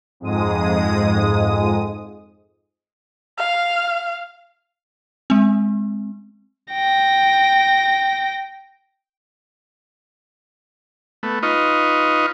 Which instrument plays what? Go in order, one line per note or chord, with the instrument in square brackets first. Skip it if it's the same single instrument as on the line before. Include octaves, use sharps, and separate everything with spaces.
[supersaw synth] F2 G#2 G#3 D#6
[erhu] F5
[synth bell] G#3 C4
[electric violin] G5 A#6
[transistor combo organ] A3 B3
D#4 F4 B4 D#5 C#6